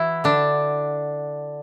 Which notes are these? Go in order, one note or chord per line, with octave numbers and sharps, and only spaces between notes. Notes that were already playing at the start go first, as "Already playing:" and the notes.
Already playing: E3 E4 F#4
D3 D4